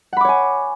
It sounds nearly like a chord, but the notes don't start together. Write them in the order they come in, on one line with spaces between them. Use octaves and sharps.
F#5 B5 D6 C#5 G#5